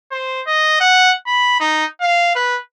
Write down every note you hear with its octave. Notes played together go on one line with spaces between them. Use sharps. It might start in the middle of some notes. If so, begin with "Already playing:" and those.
C5
D#5
F#5
B5
D#4
F5
B4